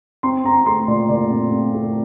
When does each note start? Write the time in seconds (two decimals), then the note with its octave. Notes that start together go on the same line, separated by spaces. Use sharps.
0.23 C4 C6
0.44 C4 A#5
0.66 A3 C6
0.88 A#2 D5
1.09 A#2 D5
1.30 C4
1.52 C4
1.75 A3